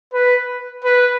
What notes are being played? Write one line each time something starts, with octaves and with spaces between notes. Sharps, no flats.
B4
B4